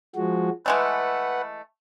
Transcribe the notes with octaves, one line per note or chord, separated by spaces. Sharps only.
F3 G#3 F#4
E3 G#3 A3 B4 F#5